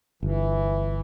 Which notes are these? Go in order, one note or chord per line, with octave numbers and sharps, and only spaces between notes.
G1 E3